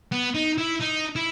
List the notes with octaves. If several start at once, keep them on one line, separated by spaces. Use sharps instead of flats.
B3
D#4
E4
D#4
E4